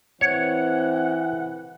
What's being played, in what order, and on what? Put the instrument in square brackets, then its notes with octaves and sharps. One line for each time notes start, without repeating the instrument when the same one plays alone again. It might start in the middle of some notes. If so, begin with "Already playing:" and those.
[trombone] E3 [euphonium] C4 [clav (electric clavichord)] C#5 [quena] F#5